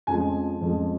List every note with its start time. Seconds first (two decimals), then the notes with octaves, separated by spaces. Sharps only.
0.07 F2 C#3 F3 G#3 G#5
0.61 F2 C#3 F3 G#3